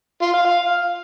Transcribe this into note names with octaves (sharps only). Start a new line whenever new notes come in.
F4
F5
F5